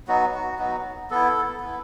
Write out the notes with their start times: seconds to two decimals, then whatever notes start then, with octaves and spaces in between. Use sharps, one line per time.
0.08 F#3 B3 D#4 F#4
0.34 F#4
0.58 F#3 B3 D#4 F#4
1.10 B3 E4 A4
1.60 B3 E4